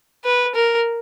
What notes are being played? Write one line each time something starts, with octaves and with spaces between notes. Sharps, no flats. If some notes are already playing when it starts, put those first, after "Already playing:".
B4
A#4